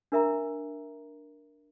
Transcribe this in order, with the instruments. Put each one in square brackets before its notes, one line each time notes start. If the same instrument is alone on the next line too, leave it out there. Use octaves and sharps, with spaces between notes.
[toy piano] D4 A#4 E5 A#5